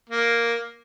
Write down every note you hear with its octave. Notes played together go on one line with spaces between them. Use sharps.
A#3